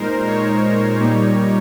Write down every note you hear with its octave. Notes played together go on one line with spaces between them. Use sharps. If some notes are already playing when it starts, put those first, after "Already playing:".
Already playing: A#2 G#3 D#4 A#4 C5
C#5
A#2 G3 A#3 D#4